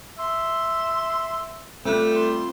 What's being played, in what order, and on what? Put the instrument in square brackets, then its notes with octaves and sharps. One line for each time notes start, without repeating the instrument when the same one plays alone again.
[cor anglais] E5 [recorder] C6
[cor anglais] G3 [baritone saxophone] A3 [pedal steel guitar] C4 F4 F#6
[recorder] C6